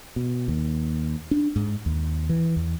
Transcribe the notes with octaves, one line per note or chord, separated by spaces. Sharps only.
B2
D#2
D4
G#2
D#2
E3
E2